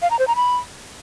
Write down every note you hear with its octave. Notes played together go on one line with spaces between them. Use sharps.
F5
A#5
C5
A#5
B5